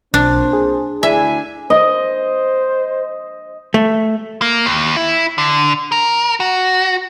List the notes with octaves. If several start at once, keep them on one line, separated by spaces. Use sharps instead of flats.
B1 A#2 C4 D4 C5
G#4
D2 D4 E4 E5 G#5
C5 D#5
A3
A#3
D#2
E4
D3
A#4
F#4